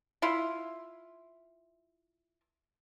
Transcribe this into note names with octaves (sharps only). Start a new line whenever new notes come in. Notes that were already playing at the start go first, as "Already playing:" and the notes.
E4 F4